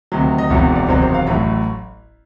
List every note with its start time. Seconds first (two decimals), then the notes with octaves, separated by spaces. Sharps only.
0.12 D2 C3 D#3 F#3
0.38 D#5
0.50 E1 E2 C3 D#3 F#3 E5
0.76 D5
0.88 E1 E2 C3 D#3 F#3 C5
1.02 C5
1.14 F5
1.27 A1 A2 F#3 E5